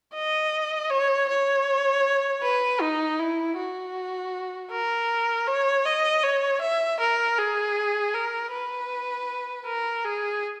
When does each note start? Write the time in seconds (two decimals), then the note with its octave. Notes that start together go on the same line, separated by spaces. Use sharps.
0.14 D#5
0.90 C#5
1.29 C#5
2.43 B4
2.81 D#4
3.19 E4
3.57 F#4
4.71 A#4
5.47 C#5
5.85 D#5
6.23 C#5
6.61 E5
7.00 A#4
7.38 G#4
8.14 A#4
8.52 B4
9.66 A#4
10.05 G#4